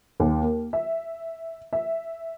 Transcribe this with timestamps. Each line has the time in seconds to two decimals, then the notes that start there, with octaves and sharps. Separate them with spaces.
0.20 D#2
0.42 A#3
0.73 E5
1.73 E5